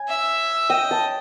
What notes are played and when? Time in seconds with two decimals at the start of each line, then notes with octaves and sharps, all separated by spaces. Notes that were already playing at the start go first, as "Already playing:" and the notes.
Already playing: G#5
0.08 E5
0.70 D#5 G5
0.91 A5